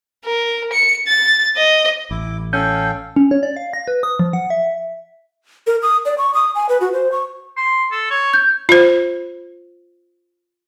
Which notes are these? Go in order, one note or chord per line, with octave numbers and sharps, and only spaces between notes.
A#4
C#7
A6
D#5
A1 E4 D6
C#4 A4 F5 G5 G6
C#4
C#5
D5
F5
A#6
B4
D#6
F3
F#5
E5
A#4
D#6
D5
C#6
D#6
G#5
B4
F#4
C5
C#6
C6
A4
C#5
G6
F4 C5